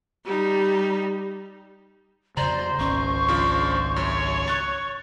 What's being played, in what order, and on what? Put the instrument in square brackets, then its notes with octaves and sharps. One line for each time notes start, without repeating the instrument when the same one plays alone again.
[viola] G3 D#4
[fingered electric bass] F2 C#3 [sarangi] C5 [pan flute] D5 [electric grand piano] A#5
[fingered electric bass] G#1 C#2 C#4 [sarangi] C5 [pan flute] C#6
[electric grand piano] C#3 F3 D4
[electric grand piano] F#2 [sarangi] C#5
[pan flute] C#6 [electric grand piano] F#6 A6